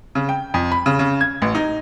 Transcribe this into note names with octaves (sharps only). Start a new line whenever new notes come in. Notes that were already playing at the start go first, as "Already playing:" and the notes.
C#3
G5
F2
B5
C#3
C#3
G#6
A1
D#4